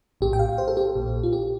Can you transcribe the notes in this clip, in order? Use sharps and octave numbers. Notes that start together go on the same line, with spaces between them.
A#1 A2 G4
G5
F5
C5
A4
G4
A#1 A#2
F4
G4